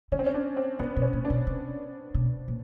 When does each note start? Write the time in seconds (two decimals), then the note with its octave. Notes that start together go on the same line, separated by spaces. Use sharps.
0.12 D3 C#4
0.19 C4
0.26 C#4
0.34 D4
0.57 C4
0.79 C#3 B3
0.97 B2
1.02 C#4
1.13 A#2
1.25 D4
1.30 B2
1.47 C3
2.14 B2
2.48 A#2